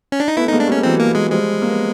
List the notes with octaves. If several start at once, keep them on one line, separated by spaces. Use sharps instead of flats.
C#4
D4
D#4
A3 B3 E4
B3 D#4
G#3 A#3
D4
G3 A3 C#4
E3 F#3 C4
A#3
G#3
F3 G3 G#3
A#3
B3